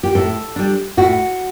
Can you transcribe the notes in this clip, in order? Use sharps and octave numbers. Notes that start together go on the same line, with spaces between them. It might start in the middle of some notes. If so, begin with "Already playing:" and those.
G4
A2 A4
G3 D4
A2 F#4